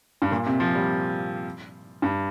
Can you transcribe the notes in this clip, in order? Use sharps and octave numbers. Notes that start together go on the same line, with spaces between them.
G2
A#2
C3
F3
G3
G2